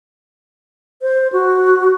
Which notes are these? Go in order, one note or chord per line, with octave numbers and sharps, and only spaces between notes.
C5
F#4